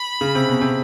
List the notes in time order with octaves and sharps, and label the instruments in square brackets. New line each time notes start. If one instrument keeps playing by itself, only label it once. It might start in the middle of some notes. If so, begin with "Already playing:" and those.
Already playing: [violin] B5
[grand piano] C#3
C3
B2
C3